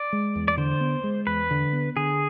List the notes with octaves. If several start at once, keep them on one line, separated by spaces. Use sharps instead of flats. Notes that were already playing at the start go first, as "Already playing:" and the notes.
Already playing: D5
G#3
E2
D5
D3 C5
B3
G#3
E2 B4
D3
B3
D3 G#4